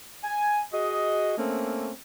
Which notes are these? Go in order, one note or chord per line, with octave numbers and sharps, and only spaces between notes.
G#5
F#4 G#4 D#5
A3 A#3 C4 C#4